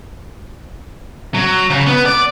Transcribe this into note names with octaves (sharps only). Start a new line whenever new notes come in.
F#3
C#3
B3
D5